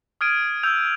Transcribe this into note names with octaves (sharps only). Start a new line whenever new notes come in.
D#6 F6 G#6 D7 D#7
E6 G6 F7